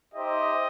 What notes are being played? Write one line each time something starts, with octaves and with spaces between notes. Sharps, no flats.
D#4 G4 C5 D#5 E5